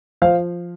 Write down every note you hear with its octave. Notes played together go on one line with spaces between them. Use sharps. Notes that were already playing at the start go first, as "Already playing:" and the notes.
F3 C5 F5